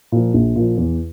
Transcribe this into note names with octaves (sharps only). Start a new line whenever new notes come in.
A#2 F3
A#1
A#2 F3
E2